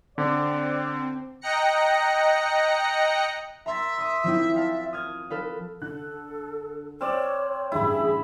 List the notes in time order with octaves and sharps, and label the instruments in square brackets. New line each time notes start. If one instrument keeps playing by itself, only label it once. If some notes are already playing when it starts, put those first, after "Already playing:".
[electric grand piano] D3 [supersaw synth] C4 [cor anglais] D5
[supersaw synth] D#5 G5 A#5 F#6 A#6 C#7
[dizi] E5 [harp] A#5 C6 A6
[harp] C6 D#6
F3 C4 E4
F5 A5
D#6 F6 G#6
A4 B4 F5
[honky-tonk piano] D3 F#6 [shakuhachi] A4
[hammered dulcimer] C4 D5 [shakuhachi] C#5 [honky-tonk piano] F6 E7
[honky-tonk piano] A1 D2 G3 [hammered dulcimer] E4 B5 [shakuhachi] G#4